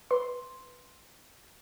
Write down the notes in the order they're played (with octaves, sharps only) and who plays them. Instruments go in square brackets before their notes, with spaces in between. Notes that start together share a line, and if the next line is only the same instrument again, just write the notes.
[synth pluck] B4 C6